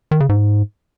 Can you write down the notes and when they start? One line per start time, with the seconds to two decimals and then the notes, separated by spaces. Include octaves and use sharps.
0.11 D#3
0.20 C#3
0.29 G#2